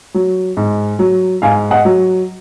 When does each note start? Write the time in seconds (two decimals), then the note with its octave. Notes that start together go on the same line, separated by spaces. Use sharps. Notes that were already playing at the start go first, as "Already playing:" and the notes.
0.14 F#3
0.57 G#2
0.99 F#3
1.42 G#2 F5 G#5
1.71 D#5 F#5
1.85 F#3